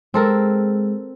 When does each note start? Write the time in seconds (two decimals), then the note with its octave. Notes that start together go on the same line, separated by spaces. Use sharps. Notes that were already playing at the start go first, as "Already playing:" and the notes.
0.14 G#3 C4 A4 A#4